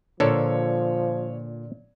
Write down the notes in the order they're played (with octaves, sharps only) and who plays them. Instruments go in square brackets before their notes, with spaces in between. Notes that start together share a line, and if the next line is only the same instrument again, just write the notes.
[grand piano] A#2 [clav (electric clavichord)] D3 A4 A#4 [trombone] F3 [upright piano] C#5